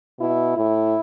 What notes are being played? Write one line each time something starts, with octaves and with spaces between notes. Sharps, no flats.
B2 E4
A2 E4